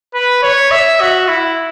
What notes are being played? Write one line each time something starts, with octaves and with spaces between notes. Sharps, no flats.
B4
C#5
E5
F#4
E4